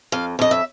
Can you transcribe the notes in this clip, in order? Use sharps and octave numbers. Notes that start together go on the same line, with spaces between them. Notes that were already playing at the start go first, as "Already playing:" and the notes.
F2 F5
F2 D#5
E5